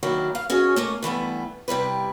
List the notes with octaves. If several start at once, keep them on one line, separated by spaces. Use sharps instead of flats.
D#3 F#3 A#3 D4 E4
F5
C#4 F#4 G#4 C#5 D#5
A3 A#3 C#4 D#5
G2 E3 A3 B3
C3 G3 E4 B4